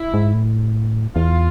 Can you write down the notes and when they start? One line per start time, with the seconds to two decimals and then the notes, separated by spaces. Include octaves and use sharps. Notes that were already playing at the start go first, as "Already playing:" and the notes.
Already playing: E4
0.14 G#2
0.34 A2
1.15 E2 F4